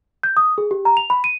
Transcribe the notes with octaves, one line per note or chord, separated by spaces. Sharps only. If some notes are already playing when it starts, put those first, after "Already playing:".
G6
D#6
G#4
G4
A#5
F7
B5
D#7